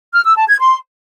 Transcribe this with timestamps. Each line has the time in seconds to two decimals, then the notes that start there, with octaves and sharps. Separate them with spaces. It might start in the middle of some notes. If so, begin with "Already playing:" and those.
0.13 F6
0.25 E6
0.36 A5
0.48 G#6
0.60 C6